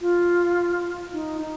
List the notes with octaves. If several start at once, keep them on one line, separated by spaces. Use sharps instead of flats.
F4
D#4
D#4